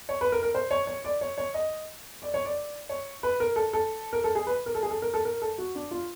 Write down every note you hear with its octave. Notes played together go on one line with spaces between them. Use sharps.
C#5
B4
A#4
A#4
C5
C#5
C#5
D5
C#5
C#5
D#5
D5
C#5
D5
C#5
B4
A#4
A4
A4
A#4
A4
G#4
B4
A#4
A4
G#4
A4
A#4
A4
A#4
A4
F#4
D4
F4